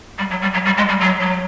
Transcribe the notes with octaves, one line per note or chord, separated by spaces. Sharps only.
G3
F#3
G3
F#3
G3
G#3
G3
F#3
F#3